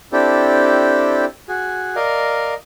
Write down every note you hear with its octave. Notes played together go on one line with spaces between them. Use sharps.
C4 D4 E4 G4 A4
F#4 G#4
A#4 D5 D#5 F5